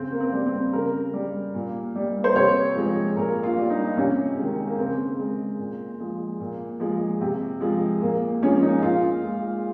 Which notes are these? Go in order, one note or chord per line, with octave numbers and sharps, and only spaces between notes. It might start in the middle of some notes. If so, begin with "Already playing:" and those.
Already playing: C#3 C4
A#3
C4
G3
C4
C#3 A#4
G3
A#2
G3
C5
C3 C#5
F3 G#3
A#2 A#4
F4
G3
D#4
C3 C#4
D#3 G#3
A#3
C#3 C4
G#3
A#2
F3 G#3
A#2
F3 G#3
C3
F3 G#3
A#2 A#3
F3 G#3 C#4
D#4
A#2 F4
G#3